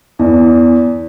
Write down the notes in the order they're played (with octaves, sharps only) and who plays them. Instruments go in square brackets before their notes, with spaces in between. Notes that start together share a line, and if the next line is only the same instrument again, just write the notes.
[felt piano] E2